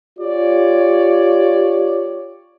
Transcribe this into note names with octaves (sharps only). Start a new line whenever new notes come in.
F4 G4 C#5 D5